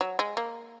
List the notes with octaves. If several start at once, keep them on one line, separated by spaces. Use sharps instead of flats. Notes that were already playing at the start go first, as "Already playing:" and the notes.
F#3
G#3
A#3